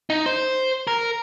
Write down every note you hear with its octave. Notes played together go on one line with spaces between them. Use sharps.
D#4
C5
A#4